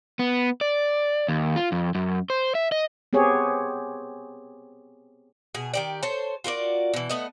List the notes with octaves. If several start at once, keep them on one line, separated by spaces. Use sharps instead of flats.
B3
D5
D#2
F4
F2
F#2
C5
E5
D#5
B3 C4 G4 G#4 C#5
B2 G#4
D#3 G4 D5
A4 C5 C#5
F4 F#4 A#4 D5
B2 E3
A3 B3 D#5